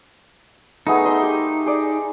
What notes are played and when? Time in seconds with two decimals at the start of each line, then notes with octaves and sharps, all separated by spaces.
0.87 A3 B3 D#4 G#4
1.06 D#5 E5 C6
1.22 G4
1.66 G#4 D5